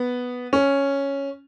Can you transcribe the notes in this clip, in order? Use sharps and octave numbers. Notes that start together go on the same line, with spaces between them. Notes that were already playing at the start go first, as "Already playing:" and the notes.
Already playing: B3
C#4